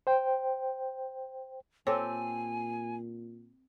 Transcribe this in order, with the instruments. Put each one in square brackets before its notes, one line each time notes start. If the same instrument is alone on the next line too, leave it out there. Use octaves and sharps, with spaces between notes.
[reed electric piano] C5 G5
[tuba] A#2 [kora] C4 G4 A4 [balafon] C#5 [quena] G#5